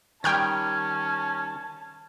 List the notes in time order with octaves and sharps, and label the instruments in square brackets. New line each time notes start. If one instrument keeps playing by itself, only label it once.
[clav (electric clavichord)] D#3 G3 [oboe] C#4 [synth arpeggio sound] G5 F6 G#6 [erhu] A5